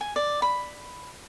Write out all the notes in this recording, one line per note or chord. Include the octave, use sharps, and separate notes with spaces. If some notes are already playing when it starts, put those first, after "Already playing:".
G#5
D5
B5